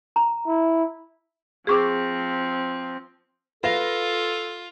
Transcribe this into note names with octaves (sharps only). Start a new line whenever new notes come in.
A#5
E4
F3 C4 G#4 C#6 D6
F4 A4 B4 F5 A#6